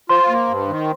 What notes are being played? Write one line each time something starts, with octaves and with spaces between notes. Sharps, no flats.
F4 C5 C6
A#3
G2
D#3